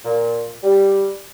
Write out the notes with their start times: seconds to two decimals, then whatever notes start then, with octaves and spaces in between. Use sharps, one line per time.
0.04 A#2
0.63 G3